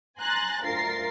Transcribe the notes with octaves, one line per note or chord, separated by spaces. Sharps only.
G#5 A#5 C6 F#6 A6
D2 F4 A#4 A6 C7